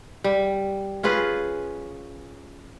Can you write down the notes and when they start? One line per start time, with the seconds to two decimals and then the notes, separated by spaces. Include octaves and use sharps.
0.24 G3
1.03 C#4 F4 G#4 B4